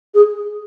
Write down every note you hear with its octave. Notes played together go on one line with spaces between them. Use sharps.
G#4